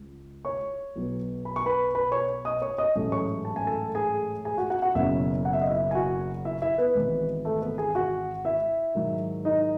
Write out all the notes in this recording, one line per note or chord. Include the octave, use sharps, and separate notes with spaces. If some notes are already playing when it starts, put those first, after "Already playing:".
Already playing: C#2
C#5 C#6
B1 B2 F#3 B3
B5
C#6
B4 B5
B4 B5
C#5 C#6
D#5 D#6
C#5 C#6
D#5 D#6
A1 G#2 F#3 A3 C#4
C#5 C#6
A5
G#5
A4 A5
G#4 G#5
G#4 G#5
F#4 F#5
F#4 F#5
F#4 F#5
F#1 E2 B2 F#3 C#4 E4 E5
F#5
E5
D#5
E4 E5
G#5
F#4 F#5
E4 E5
E4 E5
B3 B4
G#1 G#2 E3 B3
A3 A4
B3 B4
G#4 G#5
F#4 F#5
E4 E5
G#2 D#3 F#3
D#4 D#5